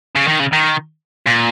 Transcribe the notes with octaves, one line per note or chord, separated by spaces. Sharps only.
C#3
D#3
C#3
D#3
A#2